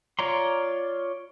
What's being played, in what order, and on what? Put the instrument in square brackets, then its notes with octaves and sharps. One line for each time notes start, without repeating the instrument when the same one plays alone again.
[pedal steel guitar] F4 C#5 D5 A#5 C6